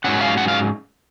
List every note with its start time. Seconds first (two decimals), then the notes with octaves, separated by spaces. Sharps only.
0.04 G#2 F#3 C#4 F#5
0.21 F5
0.37 F#5
0.48 F5